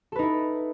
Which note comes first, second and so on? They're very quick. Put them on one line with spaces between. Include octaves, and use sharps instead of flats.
A4 B4 D#4 E4